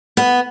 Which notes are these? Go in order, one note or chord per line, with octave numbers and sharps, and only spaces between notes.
B3